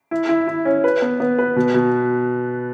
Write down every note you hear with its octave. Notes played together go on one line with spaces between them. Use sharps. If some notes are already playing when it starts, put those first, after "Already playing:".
E4
E4
E4
C#4
B4
B3
B3
B4
B2
B2